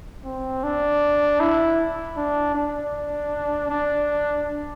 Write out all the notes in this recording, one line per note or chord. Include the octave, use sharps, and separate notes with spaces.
C4
D4
E4
D4
D4
D4